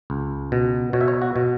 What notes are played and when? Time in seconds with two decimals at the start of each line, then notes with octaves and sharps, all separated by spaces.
0.10 C#2
0.52 B2
0.93 B2 C#5
1.01 E5
1.08 C#5
1.22 F#4
1.36 B2